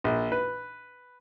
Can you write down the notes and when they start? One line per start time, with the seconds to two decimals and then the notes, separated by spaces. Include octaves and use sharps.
0.04 A#1
0.32 B4